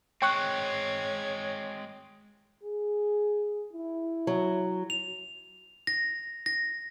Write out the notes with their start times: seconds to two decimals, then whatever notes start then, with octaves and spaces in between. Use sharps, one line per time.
0.22 G#3 C4 C#5 G5 C#6 F#6
2.64 G#4
3.73 E4
4.27 F#3
4.90 F7
5.87 A#6
6.46 A#6